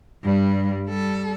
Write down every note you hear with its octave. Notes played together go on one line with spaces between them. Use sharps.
G2 G3
G3 A4